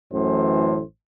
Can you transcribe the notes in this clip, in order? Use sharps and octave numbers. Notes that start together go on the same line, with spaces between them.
A1 F#2 A2 E3 C5